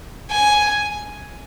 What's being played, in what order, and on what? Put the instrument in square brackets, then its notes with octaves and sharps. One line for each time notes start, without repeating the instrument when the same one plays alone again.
[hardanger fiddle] G#5